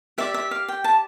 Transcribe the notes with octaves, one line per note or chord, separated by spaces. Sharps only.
G4 D5 E5
E5
F5
G5
A5